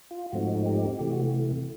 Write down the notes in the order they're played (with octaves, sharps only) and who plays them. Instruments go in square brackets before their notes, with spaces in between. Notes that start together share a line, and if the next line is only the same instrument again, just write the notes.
[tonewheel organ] F4
G#2 F3 A3 C4 D#4 F#4
G4
C3 E3 A3 G4
F#4